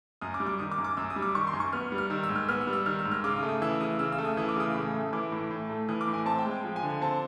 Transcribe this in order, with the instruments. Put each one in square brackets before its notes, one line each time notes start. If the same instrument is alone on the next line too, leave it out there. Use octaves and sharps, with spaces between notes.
[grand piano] F#2 D#6
D6
G3
D6
D#3 D#6
D6
F#2
D6
F#2 E6
D#6
G3
D6
D#3 C#6
C6
F#2
C#6
B3 F6
G3
F6
D#3 E6
E6
G#2
F6
B3 F6
E6
G3
E6
D#3 F6
E6
G#2
F6
C#3 D6
D#6
A3
D#6
E3 E6
C#3 D#6
C#3 E6
E6
A3
D#6
E3 D#6
D6
C#3 D#6
A2
A3
E3 D6
A2
A2
A3
E3 D#6
D6
A2
G#5
C4 A5
G5
G#3
G5
F3
G#5
D3
G#5
C4 A5